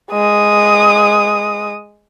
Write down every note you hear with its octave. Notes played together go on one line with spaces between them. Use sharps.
G#3 D#6